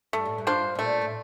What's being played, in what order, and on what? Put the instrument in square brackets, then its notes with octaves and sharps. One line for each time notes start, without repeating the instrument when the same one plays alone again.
[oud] G2 [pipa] A3
[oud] A2
G2
[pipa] D4 F4 C5
[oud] C3
[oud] A#2 [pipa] A3
[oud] A2